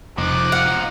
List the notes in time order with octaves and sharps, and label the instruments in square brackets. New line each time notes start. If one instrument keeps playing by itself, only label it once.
[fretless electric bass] F1 [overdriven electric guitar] F3 D#4 [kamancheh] D6 F#6
[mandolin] F5 F#5